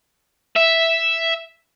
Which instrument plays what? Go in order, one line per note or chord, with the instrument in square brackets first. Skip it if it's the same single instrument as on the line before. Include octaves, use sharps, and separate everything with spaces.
[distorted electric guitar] E5